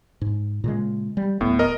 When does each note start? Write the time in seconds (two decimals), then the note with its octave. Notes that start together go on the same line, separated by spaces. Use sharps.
0.21 G#2
0.64 A#2 C#3 G#3
1.17 G3
1.41 D1 A2 B3
1.59 A#4 D#5